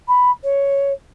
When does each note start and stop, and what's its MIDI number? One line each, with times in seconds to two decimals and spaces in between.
0.08 0.30 83
0.43 0.92 73